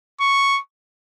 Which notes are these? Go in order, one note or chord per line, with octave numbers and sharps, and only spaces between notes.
C#6